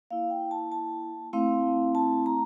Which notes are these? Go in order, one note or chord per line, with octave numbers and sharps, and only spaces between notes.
A#3 E4 F5
G5
A5
A5
A3 C4 E4 F5
A5
A#5